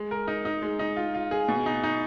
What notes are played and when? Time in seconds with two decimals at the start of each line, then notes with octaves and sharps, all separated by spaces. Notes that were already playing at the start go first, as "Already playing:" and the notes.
Already playing: G#3
0.11 A#4
0.28 D#4
0.45 D#4
0.62 G#3
0.79 D#4
0.96 F4
1.15 F4
1.31 G#4
1.48 B2
1.66 D#4
1.83 D#4